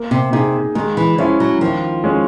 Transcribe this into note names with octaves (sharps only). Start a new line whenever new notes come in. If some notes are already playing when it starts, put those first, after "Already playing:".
Already playing: A#3
C3
C3 D#4 G#4
D#3 G#3
E3
F3 C#4 E4
F#3
D#3 F3
G#3 C#4